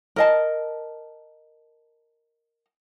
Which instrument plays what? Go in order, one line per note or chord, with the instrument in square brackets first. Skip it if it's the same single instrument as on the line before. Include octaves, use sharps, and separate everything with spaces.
[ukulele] A#4 D#5 A5